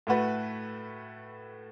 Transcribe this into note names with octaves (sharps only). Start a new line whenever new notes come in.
A2 A3 F#4 B4